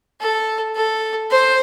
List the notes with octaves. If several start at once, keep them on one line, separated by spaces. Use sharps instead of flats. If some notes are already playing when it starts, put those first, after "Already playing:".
A4
A4
C5